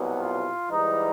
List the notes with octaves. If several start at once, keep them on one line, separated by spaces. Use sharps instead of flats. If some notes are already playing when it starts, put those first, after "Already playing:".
Already playing: C2 B2 F#3 B3
F4
G#2 E3 G3 D#4